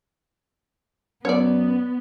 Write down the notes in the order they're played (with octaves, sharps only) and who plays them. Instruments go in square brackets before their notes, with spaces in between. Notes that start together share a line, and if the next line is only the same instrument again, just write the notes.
[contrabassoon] F#2 [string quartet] B3 [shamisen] C#5 D5